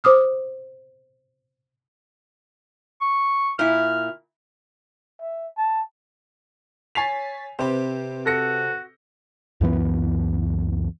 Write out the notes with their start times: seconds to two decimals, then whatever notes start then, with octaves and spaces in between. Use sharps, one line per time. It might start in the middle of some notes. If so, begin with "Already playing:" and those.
0.04 C5 D6 D#6 F6
3.01 C#6
3.59 A#2 E4 F6
5.20 E5
5.57 A5
6.95 C#5 G#5 A6 B6 C7 F7
7.59 C3 C4 G4 B4 C5
8.26 F#4 A4 A#6 C#7
9.61 C#2 F#2 E3 B3